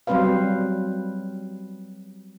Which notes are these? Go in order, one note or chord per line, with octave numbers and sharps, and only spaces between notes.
F#3 G3 C4 B4 C5 F5